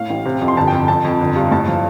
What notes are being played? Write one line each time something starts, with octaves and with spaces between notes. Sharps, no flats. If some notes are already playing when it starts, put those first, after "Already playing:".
Already playing: A2 F5
A1
C3
F2
C6
G1 A5
F2 G5
F2 A5
F2
G1
G2
A2 A5
F3